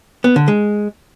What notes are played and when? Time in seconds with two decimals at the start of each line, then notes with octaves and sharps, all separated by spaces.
0.24 B3
0.36 D3
0.48 G#3